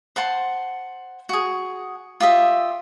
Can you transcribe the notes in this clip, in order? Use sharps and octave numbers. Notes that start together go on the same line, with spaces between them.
C5 F#5 A5 C6
F#4 G#4
F4 G4 D#5 E5